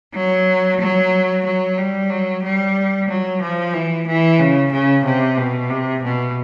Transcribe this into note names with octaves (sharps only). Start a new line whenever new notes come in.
F#3
F#3
F#3
G3
F#3
G3
F#3
F3
E3
E3
C#3
C#3
C3
B2
C3
B2